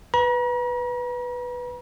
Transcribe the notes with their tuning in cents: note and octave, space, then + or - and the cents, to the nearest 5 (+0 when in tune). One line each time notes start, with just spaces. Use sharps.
B4 +0 A#5 +45